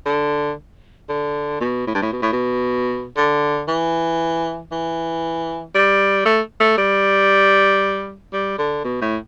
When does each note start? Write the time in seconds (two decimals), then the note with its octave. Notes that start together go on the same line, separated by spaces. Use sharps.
0.05 D3
1.09 D3
1.60 B2
1.87 A2
1.95 G2
2.02 A2
2.12 B2
2.22 A2
2.32 B2
3.16 D3
3.68 E3
4.72 E3
5.75 G3
6.26 A3
6.60 A3
6.78 G3
8.33 G3
8.58 D3
8.84 B2
9.01 A2